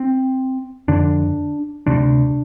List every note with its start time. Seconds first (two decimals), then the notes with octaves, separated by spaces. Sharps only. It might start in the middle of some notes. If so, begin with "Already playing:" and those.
Already playing: C4
0.88 F2 D3 D4
1.87 D2 C3 D4